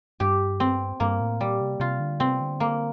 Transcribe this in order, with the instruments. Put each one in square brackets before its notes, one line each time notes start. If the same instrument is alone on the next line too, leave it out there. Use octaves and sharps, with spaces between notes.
[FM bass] G2 [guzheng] G4
[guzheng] C4
[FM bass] G2 [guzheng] A#3
[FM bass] A2
[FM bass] A#2 [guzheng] G3
[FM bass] C3
[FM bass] C3 [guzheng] F4
[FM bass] D3
[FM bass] C3 [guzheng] C4
[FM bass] D3
[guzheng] A#3